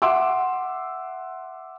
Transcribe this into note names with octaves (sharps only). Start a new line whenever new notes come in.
E5 F#5 C6 D6 E6